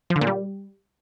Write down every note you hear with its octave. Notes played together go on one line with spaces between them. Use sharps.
F3
D3
A#2
G3